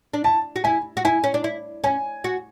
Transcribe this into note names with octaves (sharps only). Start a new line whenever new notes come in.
D4
E4 A5
F#4
E4 G#5
F#4
E4 G#5
C#4
D4
E4
C#4 G#5
F#4